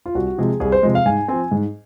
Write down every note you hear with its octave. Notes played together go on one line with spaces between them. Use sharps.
F4
C2 F#4
C3 F3 G#3 G#4
C2 G#4
C5
C3 F3 G#3
F5
G#2 G#5
F3 C4 G#5
G#2